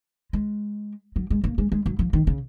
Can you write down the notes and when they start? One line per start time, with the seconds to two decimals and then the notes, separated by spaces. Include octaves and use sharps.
0.33 G#3
1.16 F#3
1.30 G#3
1.44 A#3
1.58 G#3
1.72 G#3
1.86 F#3
1.99 F3
2.13 D#3
2.27 C#3